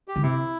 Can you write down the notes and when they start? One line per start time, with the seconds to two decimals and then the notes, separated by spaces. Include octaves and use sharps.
0.08 G4
0.16 D3
0.22 C3 E4